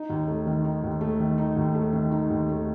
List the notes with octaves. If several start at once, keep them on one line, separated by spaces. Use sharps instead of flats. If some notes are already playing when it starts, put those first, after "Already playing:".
Already playing: D#4
D#2
A3
D#3
D#4
D#2
A3
D#3
D#4
D#2
A3
D#3
D#4
D#2
A3